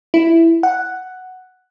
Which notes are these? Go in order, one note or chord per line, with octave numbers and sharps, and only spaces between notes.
E4
F#5